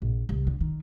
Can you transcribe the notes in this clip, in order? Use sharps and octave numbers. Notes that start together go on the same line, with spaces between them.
A#1
C2
D3
D#3